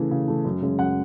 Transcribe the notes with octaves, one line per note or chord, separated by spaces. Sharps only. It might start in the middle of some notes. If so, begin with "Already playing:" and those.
Already playing: C#3 E3 A3
C#3
E3 A3
F#2
C#3 G#3 C#4
F#2 F#5